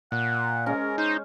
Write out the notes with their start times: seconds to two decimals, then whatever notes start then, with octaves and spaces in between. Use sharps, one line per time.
0.12 A#2 F#5
0.66 G#3 C#4 A#4
0.98 D#4 C5